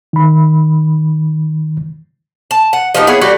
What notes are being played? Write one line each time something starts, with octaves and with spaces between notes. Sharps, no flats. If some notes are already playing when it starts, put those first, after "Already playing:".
D#3 B5
A5
F#5
F3 B3 D#4 G4
B3 E4 G#4 C#5
G3 A3 F#4 D5